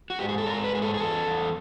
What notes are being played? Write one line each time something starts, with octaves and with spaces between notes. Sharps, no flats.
F#4
G#2 G4
G#4
A4
G#2 A#4
B4
G#2 G#4
A4
G#4
E2 A4
E2